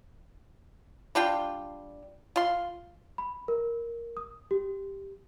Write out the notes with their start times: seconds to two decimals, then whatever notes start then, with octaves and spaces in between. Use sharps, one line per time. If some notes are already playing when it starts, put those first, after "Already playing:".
1.15 G3 D4 F4 G5
2.36 F4 C6
3.18 B5
3.48 A#4
4.17 D#6
4.51 G4